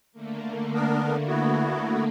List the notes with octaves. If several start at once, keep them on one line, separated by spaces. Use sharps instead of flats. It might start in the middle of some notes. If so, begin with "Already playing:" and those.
D3 A3 A#3
B3 D4 A#4
B3 E4 F#4